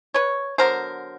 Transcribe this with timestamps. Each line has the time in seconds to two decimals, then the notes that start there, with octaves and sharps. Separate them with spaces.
0.14 B4 C#5
0.58 D3 F#3 B3 A#4 C5